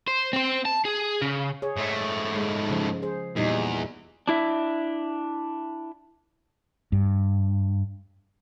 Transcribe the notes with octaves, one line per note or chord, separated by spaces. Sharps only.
C5
C4 C5
A5
G#4
C#3
G#4 C#5
G#2 A3
G#3
C#3 F3
G#4 C5
E2 A#2 G3 D#4
D4 E4 E5
G2